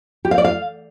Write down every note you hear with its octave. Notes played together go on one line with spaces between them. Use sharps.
G4
F5
D5
F5